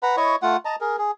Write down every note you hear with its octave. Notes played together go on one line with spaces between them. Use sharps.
B4 F#5 A#5 B5
E4 C#5 D#5 C#6
A3 F4 F#5
D#5 A5 A#5
G#4 A#4
G#4